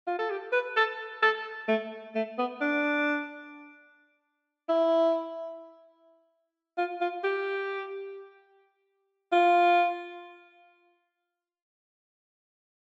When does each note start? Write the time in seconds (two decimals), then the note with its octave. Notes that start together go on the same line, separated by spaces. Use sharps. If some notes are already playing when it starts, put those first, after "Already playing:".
0.07 F4
0.19 A4
0.30 G4
0.52 B4
0.76 A4
1.22 A4
1.68 A3
2.15 A3
2.38 B3
2.61 D4
4.69 E4
6.78 F4
7.01 F4
7.24 G4
9.32 F4